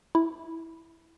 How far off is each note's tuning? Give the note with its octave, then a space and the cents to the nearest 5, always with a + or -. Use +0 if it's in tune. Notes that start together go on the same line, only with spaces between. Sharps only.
E4 -5